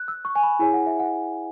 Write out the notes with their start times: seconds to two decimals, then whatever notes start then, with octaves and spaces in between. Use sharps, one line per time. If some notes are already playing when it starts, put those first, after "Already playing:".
Already playing: F#6
0.08 E6
0.25 C#6
0.35 G#5
0.43 B5
0.59 E4 G#4 C#5 G#5
0.73 F#5
0.86 E5
0.99 F#5